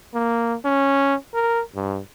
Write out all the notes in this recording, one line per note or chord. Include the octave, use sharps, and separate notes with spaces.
A#3
C#4
A#4
G2